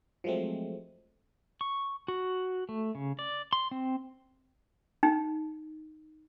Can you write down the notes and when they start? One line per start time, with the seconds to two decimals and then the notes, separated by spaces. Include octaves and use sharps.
0.24 F3 F#3 G#3 A3 C4
1.61 C#6
2.08 F#4
2.69 A3
2.95 C#3
3.19 D5
3.53 C6
3.71 C4
5.03 D#4